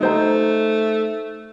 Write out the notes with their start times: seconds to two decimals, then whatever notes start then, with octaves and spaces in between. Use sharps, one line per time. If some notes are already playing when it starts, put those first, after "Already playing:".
0.01 A3 D#4 C5 A#5